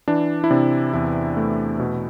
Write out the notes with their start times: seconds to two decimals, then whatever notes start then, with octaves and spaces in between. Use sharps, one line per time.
0.08 E3 D4
0.44 E4
0.51 C3 D4
0.94 E2 E4
1.37 A3
1.79 B2